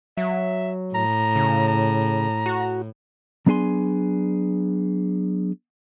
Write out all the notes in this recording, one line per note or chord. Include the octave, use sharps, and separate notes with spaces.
F#3 E5
A2 A#5
C#3
A#5
F#4
F#3 B3 D4 G#4 G#5 C6